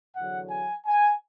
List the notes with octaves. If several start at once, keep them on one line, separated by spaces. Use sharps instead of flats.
E2 D3 F#3 F#5
G#5
G#5